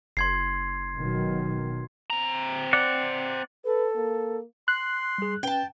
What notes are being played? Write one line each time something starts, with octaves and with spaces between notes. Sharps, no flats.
F#1 C6 G#6 C7
B2 D#3 F#3
C4 A#5
D5 F#5
A4 B4
A#3
C6 F#6
G3 G#4
C#4 B4 G5 A5